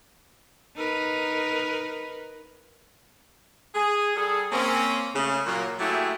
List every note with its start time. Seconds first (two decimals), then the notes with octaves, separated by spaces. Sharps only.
0.76 D#4 A#4 B4
3.75 G#4
4.16 G3 G#4 A4
4.52 A#3 C4 C#4
5.14 C#3 A3
5.46 A#2 F#3 A#3
5.79 F#3 A3 A#3 E4 G4 G#4